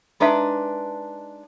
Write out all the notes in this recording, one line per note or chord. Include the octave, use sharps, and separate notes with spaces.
G#3 D4 D#4 B4 E5